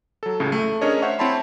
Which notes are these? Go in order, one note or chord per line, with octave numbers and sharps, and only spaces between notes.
F#3 A4
C#2 A2 C#3
A3
C#4 D4 G#4 A#4 C#5 D#5
C5 C#5 E5 F#5 C#6
C4 E4 C#5 A5 B5 C6